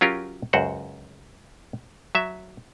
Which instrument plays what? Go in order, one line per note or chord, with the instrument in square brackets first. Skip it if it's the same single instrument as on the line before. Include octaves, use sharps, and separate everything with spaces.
[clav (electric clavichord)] F#3 C#4 F4 G4 A#4
C#2 F#2 F#4 C5 F#5
F#3 E5